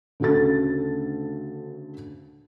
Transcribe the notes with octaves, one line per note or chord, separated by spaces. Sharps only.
D2 C#3 F#4 A4 A6